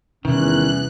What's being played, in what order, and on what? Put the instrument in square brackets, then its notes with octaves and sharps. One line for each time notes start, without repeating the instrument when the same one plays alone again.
[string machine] E2 F#6 [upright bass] C3 [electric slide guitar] D#3 [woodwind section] E3 G3 C#4